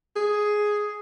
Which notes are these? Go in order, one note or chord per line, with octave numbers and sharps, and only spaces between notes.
G#4